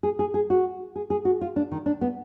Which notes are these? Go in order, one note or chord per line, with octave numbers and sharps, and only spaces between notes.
G#4
G#4
G#4
F#4
G#4
G#4
F#4
F4
D4
D#3
D4
B3